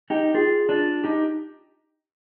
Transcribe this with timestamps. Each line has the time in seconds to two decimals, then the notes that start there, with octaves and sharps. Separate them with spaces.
0.10 D#4 G4
0.34 F4 G#4
0.69 D4 F4
1.04 D#4 G4